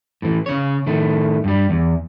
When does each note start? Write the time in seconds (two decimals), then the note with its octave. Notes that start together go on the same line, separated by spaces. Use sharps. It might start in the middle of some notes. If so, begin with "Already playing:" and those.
0.22 A2 E3
0.46 C#3 C#5
0.86 A2 D#3 A3
1.44 G2 G3
1.70 E2